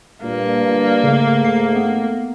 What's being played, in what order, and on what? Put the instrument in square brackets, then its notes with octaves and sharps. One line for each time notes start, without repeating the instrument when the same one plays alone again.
[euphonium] G2 [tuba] A#2 [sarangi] A#3
[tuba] G1
[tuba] G#2 [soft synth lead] C#3 [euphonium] A3
[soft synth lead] C7
B3